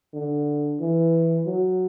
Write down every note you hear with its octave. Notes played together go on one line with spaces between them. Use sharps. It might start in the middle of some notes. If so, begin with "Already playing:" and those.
D3
E3
F#3